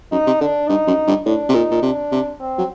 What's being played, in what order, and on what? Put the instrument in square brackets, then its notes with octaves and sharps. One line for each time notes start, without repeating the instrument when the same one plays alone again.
[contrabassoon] F#2 [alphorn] D#4
[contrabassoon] C3
[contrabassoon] D3 [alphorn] D4
[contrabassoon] G2 [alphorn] D#4
[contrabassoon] F#2
G2
[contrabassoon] A2 [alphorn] D4
[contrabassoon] C3
[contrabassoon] A#2 [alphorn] D#4
[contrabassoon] A#2
[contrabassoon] C3 [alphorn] D4
[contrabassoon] C3
[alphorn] C4
[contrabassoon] F#3